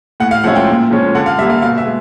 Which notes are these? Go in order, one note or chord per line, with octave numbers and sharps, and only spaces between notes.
A2 F#5
F5
F3 G#3 C#4 E4 F#5
G5
A#2
F3 G#3 C#4
D3 F#5
F5
G3 A#3 E5
F5
B2 F5
E5
G#3